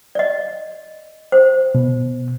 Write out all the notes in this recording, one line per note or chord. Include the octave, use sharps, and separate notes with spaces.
D5 D#5
C5
B2